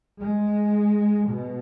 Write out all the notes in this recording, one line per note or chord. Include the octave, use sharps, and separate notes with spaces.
G#3
B2